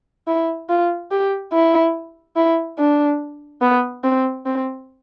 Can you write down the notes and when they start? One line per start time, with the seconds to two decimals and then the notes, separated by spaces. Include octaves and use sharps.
0.28 E4
0.69 F4
1.11 G4
1.53 E4
2.36 E4
2.79 D4
3.62 B3
4.04 C4
4.46 C4